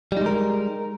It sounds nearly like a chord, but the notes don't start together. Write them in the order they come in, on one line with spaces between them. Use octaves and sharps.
G3 D#4 G#3 A#4